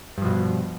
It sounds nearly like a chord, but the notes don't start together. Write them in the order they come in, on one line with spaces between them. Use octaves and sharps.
G2 F3 B2